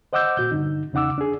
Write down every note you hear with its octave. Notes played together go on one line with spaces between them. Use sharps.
C5 D#5 F#5 D6 E6 G6
A#2 F#4 G6
G2 D3 D#4
E2 C#3 D#4 F#5 D6 E6
D4 G#4